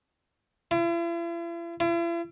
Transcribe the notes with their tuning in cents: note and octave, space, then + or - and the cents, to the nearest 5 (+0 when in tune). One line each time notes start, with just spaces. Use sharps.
E4 +45
E4 +45